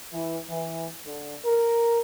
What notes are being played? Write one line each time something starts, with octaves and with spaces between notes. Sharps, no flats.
E3
E3
D3
A#4